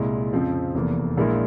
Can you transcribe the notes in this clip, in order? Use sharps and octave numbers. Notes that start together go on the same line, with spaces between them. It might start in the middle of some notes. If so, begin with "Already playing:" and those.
Already playing: C2 A#2 G#3 E4
F2 C#3 F3 C4
F1 E2 E3 A#3
A#1 A#2 G#3 E4 A#4